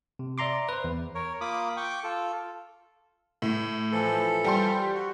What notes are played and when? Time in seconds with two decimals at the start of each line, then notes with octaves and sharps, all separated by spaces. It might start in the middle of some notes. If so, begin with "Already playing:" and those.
0.19 C3
0.38 D5 E5 A#5 C6 D6
0.69 B4 C5
0.84 E2
1.15 A#4 C#5
1.41 A#3 F4 B5 D6 D#6
1.77 G5 C#6 D6
2.04 F4 A4
3.42 A2
3.92 E3 F3 A4
4.44 G3 G4 C6
4.94 F#4